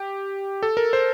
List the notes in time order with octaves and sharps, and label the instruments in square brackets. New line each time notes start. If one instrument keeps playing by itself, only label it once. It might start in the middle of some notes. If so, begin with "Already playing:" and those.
Already playing: [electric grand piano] G4
A4
A#4
C5